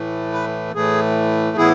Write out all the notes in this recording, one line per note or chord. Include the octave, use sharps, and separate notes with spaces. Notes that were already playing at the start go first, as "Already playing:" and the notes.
Already playing: A2 E3 A3
B4
A2 E3 A3 G#4
A2 E3 B3 E4 G#4